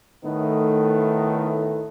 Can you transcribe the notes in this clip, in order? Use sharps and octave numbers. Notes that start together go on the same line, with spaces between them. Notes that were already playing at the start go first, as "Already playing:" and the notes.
A2 D#3 A3 B3 D#4 E4